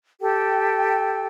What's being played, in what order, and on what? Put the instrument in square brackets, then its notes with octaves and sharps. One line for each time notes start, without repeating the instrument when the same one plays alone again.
[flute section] G4 A4 G5